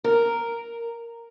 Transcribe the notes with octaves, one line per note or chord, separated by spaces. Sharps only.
A#4